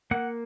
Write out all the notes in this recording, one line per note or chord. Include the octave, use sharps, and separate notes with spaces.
A#3 F#5